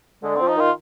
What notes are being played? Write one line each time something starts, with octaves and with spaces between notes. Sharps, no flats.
D3 G#3
F3 C4
D#4
D#3 F4